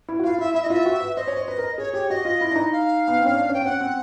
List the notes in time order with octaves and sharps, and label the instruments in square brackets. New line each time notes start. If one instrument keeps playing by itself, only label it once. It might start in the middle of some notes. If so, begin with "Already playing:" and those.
[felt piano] E4
F#4
[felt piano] F4 [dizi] F5
[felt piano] E4 [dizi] E5
[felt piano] E4 [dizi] E5
[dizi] D#5
[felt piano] E4
[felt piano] F4 [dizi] E5
[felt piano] F#4
B4
[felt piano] C5 [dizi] D#5
[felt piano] C#5
C5
B4
A#4
[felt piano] G#4 [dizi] C#5
[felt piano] G4 [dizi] C#5
[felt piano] F#4 [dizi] D#5
[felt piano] F4
E4
D4
D#4
[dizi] F5
[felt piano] B3
C4
C#4
D4
[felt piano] C#4 [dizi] G5
[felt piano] C4
[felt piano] C#4 [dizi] F#5
[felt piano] C4